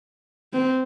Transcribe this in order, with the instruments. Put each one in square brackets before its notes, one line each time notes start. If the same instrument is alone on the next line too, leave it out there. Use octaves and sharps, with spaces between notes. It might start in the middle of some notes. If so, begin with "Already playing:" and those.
[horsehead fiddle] C4